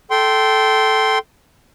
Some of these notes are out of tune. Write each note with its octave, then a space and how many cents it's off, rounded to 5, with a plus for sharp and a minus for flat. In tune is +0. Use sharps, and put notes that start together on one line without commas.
A4 -10 G5 -15 C6 +0